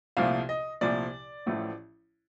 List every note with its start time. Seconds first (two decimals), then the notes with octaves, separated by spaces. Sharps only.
0.17 C2 A#2 F3 A3 F5
0.49 D#5
0.81 C2 A#2 F3 A3 D5
1.46 A1 A2 F3 A3